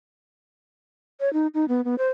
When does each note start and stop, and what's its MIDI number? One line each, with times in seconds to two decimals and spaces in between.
1.20 1.32 73
1.33 1.47 63
1.54 1.65 63
1.68 1.84 59
1.84 1.95 59
1.98 2.08 72